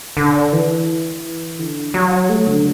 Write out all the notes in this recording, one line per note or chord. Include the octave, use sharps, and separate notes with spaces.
D3
E3
D3
F#3
A3
D3